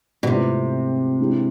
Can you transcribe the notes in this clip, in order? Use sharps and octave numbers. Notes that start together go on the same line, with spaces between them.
B2
G#2 C3 E3 A3 C4 F4
E3 G#3 D4